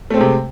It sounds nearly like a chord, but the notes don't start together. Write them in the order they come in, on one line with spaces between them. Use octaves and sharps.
A3 C4 G#3 C3